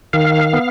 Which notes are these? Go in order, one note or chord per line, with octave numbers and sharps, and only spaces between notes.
D#3 F5
B3